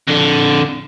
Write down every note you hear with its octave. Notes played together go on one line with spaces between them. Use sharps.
F2 D3